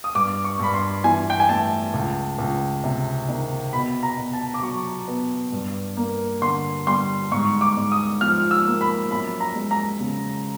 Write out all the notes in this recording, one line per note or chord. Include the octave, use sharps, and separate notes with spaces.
D#6
G2 D6
C#6
G2 B5
C6
E3 G#5
G5
G#5
A3 A5
C#2
C#2
C3
D#3
B2 B5
A#5
B2
A5
D6
F#3 C#6
B3
G2
A#3
D3 C6
G3 C6
G#2 C#6
D6
G#2
D#6
F3 F6
E6
A#3
B5
F#2 B5
A#5
G#3
A#5
C#3